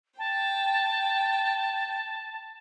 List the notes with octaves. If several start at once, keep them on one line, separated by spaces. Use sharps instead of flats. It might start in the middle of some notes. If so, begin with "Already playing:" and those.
G5 A5